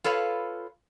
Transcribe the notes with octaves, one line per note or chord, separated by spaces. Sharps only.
F4 A4 B4 C#5 F5